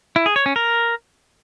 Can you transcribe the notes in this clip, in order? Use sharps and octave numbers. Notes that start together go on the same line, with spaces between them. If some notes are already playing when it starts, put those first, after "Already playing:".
E4
G#4
C#5
C#4
A#4